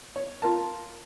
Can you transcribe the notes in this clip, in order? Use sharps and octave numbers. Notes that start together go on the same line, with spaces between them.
C#5
F4 A#4 A5